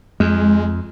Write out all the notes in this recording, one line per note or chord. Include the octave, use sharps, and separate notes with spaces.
F2 G#3